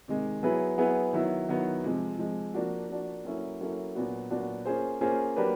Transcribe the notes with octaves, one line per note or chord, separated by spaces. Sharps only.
C3 D#3 G#3
F#3 B3 E4 G#4 B4
F#3 B3 E4 G#4 B4
D#3 F#3 B3 E4
D#3 F#3 B3 E4
C3 F3 G#3
C3 F3 G#3
F3 A#3 D4 F#4
F3 A#3 D4 F#4
F#3 A#3 C#4 E4 A4
F#3 A#3 C#4 E4 A4
A#2 F#3 B3 D4 F#4
A#2 F#3 B3 D4 F#4
A#3 C#4 F4 G#4 C5
A#3 C#4 F4 G#4 C5
F#3 A#3 D4 G4 B4